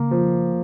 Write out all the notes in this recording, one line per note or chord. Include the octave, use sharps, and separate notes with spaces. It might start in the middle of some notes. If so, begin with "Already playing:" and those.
Already playing: C#3 A#3 C#4
F3